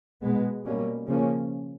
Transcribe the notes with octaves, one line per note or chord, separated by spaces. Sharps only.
B2 G#3 B3
B2 G3 A#3 C#4
C#3 F3 A#3 C#4